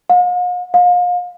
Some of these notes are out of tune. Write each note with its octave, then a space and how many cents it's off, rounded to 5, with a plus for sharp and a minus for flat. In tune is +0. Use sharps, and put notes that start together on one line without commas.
F5 +45
F5 +35